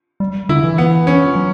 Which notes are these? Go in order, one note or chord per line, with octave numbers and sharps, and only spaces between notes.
G3
D3 E4
E3
B3
C#4
F#3